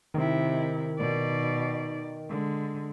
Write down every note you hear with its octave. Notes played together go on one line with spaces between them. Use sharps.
C3 D#3 E4
B2 D5
D3 G#3